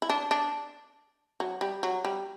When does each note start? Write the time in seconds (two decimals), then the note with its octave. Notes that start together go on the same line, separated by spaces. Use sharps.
0.02 E4
0.10 D4
0.31 D4
1.40 F#3
1.61 G3
1.83 F#3
2.05 G3